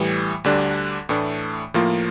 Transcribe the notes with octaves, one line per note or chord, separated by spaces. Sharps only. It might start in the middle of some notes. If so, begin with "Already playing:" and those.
Already playing: A2 E3 G3
D2 D3 G3 D4
A2 E3 A3 D4
A2 F3 A#3 F4